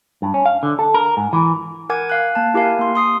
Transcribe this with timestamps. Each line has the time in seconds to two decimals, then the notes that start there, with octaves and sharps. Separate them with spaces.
0.22 G2
0.34 C#4
0.46 F5
0.63 D3
0.79 A4
0.94 A#4
1.17 G#2
1.33 E3
1.90 A#4 F#5 G#5 D6 G#6
2.09 F5 F#6
2.35 A#3 A5
2.54 E4 G4 A#4 F5 G#5
2.79 A#3 C6
2.95 C6 D#6 C7